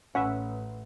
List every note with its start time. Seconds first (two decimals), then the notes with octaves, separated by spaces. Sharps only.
0.15 A1 C#4 B4 E5 F#5